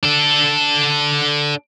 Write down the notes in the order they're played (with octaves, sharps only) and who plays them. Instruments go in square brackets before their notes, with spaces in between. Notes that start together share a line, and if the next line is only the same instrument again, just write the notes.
[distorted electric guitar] D4 A4